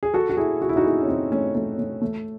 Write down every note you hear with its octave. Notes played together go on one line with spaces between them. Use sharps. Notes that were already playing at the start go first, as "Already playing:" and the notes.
G#4
F#4 A4
F#4
E4 G#4
F#4
E4
D#4 F#4
E4 G#4
C#4
C4 D#4
A3 C#4
A3 C#4
A3
A3